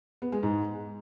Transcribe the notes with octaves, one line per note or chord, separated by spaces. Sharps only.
B3
G#3
G#2